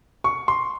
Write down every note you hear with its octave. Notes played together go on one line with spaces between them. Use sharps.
C#6
C6